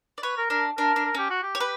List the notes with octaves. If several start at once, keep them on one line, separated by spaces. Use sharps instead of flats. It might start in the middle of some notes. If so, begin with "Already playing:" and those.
D5
B4 C#5
A#4
D4 A#4
D4 A#4
D4
A#4
C#4 G4
F#4
G4
C#5
B4